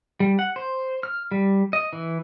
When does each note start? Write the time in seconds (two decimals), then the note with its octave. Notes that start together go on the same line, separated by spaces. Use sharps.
0.20 G3
0.39 F#5
0.56 C5
1.03 F6
1.32 G3
1.73 D#5
1.93 E3